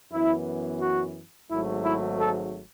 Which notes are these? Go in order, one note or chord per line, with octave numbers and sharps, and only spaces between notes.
F#2 E3 B3 E4
F#4
G#1 G#2 F#3 A3 E4
E4
A4